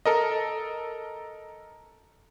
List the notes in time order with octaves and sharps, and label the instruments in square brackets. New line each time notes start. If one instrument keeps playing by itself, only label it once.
[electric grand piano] A4 A#4 D#5